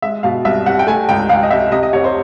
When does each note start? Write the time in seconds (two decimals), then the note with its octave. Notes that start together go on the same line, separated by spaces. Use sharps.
0.02 G#3 E5
0.23 B2 F5
0.45 C2 E5
0.66 C2 F#5
0.79 G5
0.87 A3 G#5
1.09 C#2 G5
1.29 C#2 F5
1.43 D#5
1.50 C3 E5
1.72 C3 D#5
1.83 D#5
1.93 F1 C#5
2.04 C5